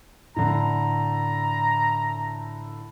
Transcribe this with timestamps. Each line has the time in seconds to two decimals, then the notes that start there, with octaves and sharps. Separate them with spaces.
0.36 A2 D3 A#5